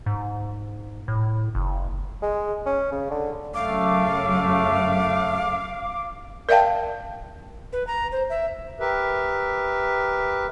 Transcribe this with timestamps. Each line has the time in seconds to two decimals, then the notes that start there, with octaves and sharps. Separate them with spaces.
0.06 G#2
1.08 A2
1.55 F#1
2.22 G#3
2.66 C#4
2.92 C#3
3.11 D3
3.54 F#2 C#3 A3 F5 D6
6.49 A#4 D5 E5 F5 G5 A5
7.73 B4
7.87 A#5
8.12 C5
8.30 E5
8.80 G4 A#4 B4 E5